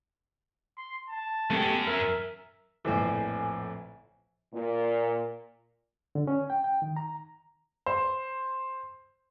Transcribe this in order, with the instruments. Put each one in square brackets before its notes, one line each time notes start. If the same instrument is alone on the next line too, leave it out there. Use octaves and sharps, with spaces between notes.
[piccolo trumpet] C6
A5
[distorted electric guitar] F#2 C#4 [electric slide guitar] A3 B3 G4
[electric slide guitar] A#4 [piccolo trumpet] E5
[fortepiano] A#1 E3 [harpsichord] F2 A2 C5 [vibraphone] G#5
[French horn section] A#2
[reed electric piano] D3
C#4
G5
G5
D#3
A#5
[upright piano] C5